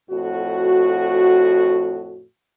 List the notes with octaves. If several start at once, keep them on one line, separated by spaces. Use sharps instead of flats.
F2 A2 F#4